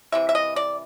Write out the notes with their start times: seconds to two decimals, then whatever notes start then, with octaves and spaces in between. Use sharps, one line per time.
0.12 C3 E3 E5
0.29 E5
0.35 D#5
0.56 D5